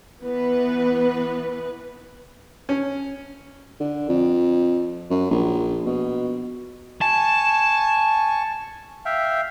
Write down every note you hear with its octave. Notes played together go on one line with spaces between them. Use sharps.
E3 B3 B4
C#4
D3
F2
F#2
A#1
B2
G#5 A5 C#6
E5 F5 G5